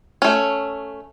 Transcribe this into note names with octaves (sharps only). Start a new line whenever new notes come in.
A3 C#4